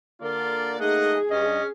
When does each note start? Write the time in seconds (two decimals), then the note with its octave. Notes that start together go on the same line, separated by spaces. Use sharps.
0.21 D3 A#3 F4 A#4 D5
0.80 A3 D#4 G#4 D#5 F#5
1.31 G2 C#4 D4 D#5